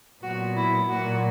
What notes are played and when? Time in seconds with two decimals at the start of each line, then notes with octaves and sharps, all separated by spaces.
0.22 A#2 F#3 B3 F#4
0.56 E4
0.89 A#2 F#3 A#3 F#4